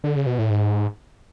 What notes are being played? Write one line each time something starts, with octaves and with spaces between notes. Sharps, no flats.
D3
C#3
B2
A2
G#2